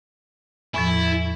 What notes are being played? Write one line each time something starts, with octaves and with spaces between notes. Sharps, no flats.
E2 A2 F3 E4